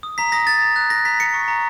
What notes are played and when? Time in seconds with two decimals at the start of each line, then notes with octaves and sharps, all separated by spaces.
0.03 D#6
0.18 A#5 B6
0.32 D#6 A#6
0.47 A#5 A6
0.62 A#5
0.76 F#6
0.90 F#6 A#6
1.05 A#5 B6
1.20 F#6 C#7
1.34 C#6
1.48 A#5